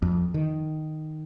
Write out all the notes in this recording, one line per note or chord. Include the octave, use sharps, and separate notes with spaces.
F2
D#3